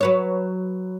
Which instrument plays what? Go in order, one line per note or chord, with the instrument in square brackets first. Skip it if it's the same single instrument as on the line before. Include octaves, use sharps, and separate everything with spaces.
[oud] F#3 B4 C#5